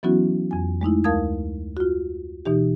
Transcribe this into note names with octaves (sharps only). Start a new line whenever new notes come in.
E3 F#3 B3 C#4 E4 F#4
F2 G#5
G#3 A3 D#4 E4
D2 A#4 F5 A5 D#6 G#6
F4 F#4
B2 E3 D#4 G4